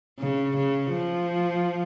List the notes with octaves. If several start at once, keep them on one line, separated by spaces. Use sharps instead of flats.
C#3
C#3
F3